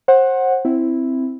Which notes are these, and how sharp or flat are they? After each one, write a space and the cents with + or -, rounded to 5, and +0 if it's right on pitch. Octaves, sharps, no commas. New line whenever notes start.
C5 +30 F#5 +0
C4 +0 E4 +0